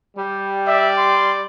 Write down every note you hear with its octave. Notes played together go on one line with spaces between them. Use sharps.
G3
D5 E5
C6